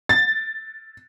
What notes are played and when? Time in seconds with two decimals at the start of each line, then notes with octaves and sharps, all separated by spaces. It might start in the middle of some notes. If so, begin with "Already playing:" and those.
0.09 A6